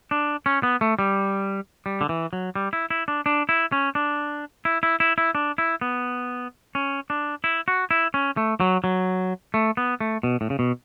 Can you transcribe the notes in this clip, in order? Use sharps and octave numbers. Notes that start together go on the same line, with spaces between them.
D4
C#4
B3
A3
G3
G3
D3
E3
F#3
G3
E4
E4
D4
D4
E4
C#4
D4
E4
E4
E4
E4
D4
E4
B3
C#4
D4
E4
F#4
E4
C#4
A3
F#3
F#3
A3
B3
A3
B2
A2
C#3
B2